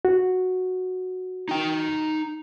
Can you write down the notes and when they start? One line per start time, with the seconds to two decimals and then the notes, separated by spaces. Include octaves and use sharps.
0.05 F#4
1.49 D#4 G5